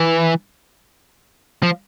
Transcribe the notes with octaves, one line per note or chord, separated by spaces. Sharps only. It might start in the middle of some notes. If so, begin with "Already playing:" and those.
Already playing: E3
F3